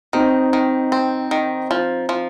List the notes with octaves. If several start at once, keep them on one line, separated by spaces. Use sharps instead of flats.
D#3 C4 D#4
D#3
C4
D#3
F3
F3